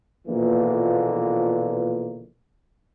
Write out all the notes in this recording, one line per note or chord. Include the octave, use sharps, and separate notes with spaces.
A#1 B2 D3 E3 F3 A#3